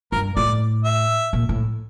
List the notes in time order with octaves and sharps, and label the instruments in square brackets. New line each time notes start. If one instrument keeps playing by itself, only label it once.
[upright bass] G2 [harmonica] A#4
[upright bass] A2 [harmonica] D5
[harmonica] E5
[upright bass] A#2
A2